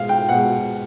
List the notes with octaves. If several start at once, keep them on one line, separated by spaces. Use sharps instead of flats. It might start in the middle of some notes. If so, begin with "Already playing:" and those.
Already playing: B2 G#3 F5
G5
B2 G#3 F#5